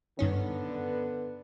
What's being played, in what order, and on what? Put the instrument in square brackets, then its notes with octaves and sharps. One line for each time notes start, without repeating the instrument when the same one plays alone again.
[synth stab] G2 D#3 C#4 [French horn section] D3 B3